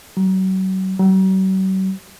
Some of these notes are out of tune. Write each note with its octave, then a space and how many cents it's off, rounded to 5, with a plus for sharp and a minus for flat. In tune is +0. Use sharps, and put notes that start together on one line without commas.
F#3 +35
F#3 +45